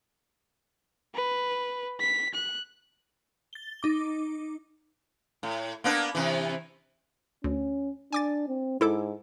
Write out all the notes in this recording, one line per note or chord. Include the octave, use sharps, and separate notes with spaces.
B4
B6
F#6
A6 G7
D#4 D6
A2
A#3 B3 D4
C3 E3
D2 C#4
D4 G#5 D6 A6
C4
G#2 E4 A4 D6